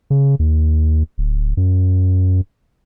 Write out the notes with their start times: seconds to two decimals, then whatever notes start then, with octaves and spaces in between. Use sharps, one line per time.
0.10 C#3
0.39 D#2
1.18 D1
1.57 F#2